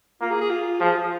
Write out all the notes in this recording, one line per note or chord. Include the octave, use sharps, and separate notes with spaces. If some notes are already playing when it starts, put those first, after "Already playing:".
A#3 F4
G#4
G#4
F4
F3 G#4
F4